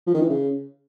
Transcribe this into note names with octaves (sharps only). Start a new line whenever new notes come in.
F3
D#3
E3
C#3